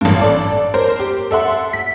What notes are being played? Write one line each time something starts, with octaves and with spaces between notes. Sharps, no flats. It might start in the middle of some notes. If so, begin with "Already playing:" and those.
A1 G2
A4 D5 A5
A#4 C5
G4
A4 E5 F#5 C6
B6